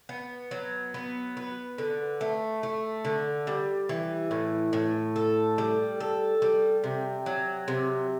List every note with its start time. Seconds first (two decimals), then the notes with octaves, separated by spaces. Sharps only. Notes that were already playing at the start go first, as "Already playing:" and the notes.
0.09 B3
0.51 F#3
0.94 B3
1.37 B4
1.78 D3
2.21 A3
2.63 A3
3.05 D3
3.47 G3
3.89 E3
4.31 A2
4.73 A2
5.16 A4
5.58 G3
6.00 A4
6.42 G3
6.84 C3
7.26 F#3
7.68 C3